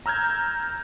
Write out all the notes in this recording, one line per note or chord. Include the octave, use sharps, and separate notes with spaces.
A#5 E6 F6 G6 G#6